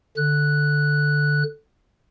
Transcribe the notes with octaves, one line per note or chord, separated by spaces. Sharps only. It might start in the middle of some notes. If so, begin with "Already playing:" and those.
D3 F#6